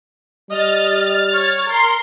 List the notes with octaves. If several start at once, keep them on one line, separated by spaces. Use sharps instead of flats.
G3 D#5 F6 A6
C#5
A#4 C6